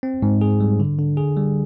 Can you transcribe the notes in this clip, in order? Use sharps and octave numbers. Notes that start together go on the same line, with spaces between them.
C4
G#2
G#4
G3
D3
D3
G#4
G3